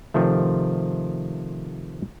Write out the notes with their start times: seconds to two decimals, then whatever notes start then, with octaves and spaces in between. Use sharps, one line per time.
0.14 C3 D#3 F3 A3